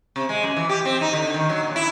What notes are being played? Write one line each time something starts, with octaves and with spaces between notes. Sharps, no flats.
C3
G#3
F#2
E3
G4
C4
D#4
D3
D#3
F#3
A#2
E4